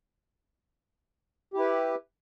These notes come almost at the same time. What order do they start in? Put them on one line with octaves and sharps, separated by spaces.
G4 E4 B4